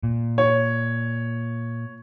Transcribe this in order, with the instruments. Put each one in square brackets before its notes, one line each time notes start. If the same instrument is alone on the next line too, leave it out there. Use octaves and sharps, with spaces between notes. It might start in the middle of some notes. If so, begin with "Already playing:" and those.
[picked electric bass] A#2
[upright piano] C#5